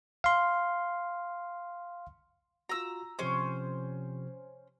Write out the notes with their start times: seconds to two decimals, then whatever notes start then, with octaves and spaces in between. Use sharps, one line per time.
0.24 F5 C6
2.69 F4 F#4 A#5 E6
3.19 C3 F3 C#4 G4 C5